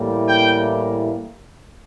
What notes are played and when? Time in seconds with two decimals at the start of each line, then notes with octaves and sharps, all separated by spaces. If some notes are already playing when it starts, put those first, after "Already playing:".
Already playing: A2 E3 G3 A#3
0.27 G5